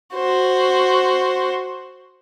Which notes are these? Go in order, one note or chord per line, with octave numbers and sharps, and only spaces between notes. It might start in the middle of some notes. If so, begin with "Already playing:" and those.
F#4 C5